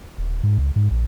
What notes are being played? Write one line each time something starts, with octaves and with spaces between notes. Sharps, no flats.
D#1
G#2
C#2
G#2
A#1